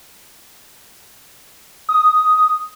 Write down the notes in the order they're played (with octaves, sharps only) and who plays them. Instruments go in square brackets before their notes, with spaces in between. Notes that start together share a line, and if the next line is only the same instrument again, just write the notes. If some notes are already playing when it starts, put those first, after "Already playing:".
[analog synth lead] D#6